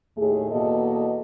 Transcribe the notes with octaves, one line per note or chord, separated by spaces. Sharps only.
D#2 A2 A3 G#4
E2 B2 A#3 A4 D#5